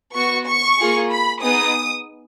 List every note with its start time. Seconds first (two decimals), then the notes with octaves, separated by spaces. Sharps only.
0.15 B3 F#4 C#6
0.47 C#6
0.78 A#3 F4 G#4
1.10 B5
1.42 B3 D#4 G#4 D#6